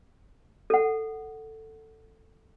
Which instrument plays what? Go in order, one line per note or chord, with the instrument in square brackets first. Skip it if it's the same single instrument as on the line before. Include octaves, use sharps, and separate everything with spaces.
[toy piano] A4 F#5